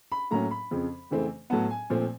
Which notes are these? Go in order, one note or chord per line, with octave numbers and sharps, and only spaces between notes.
B5
A2 F#3 A#3 C#4 A#5
B5
F2 C#3 F3
F2 C#3 E3 A3 C4
A2 F#3 B3 A5
G#5
A#2 F3 A3 C4